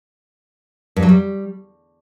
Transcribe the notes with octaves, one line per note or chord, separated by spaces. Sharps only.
G2
F#3
G3